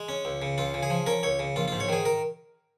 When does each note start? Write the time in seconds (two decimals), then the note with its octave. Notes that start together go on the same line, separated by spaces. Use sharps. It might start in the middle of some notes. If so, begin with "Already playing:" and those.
Already playing: G#3
0.09 C#4
0.25 C#2
0.42 C#3
0.58 C#2 F4
0.74 C#3
0.83 G#4
0.90 F3
1.06 C#4 A#4
1.23 C#2 C#5
1.39 C#3
1.56 A#1 F4
1.68 G#2 F4
1.80 C#5
1.89 D#3 G#4
2.05 A#4